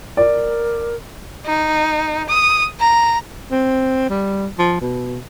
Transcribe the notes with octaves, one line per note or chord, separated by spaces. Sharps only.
A#4 D5
D#4
D#6
A#5
C4
G3
F3
B2